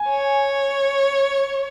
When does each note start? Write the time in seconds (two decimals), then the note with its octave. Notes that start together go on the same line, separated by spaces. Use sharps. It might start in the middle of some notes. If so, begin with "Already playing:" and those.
Already playing: G#5
0.09 C#5